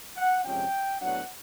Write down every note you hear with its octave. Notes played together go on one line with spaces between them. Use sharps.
F#5
F2 C3 F3 G#3 C#4 G5
A2 F#3 B3 D4 F#5